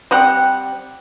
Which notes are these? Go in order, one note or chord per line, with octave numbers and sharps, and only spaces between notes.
G3 C4 F#5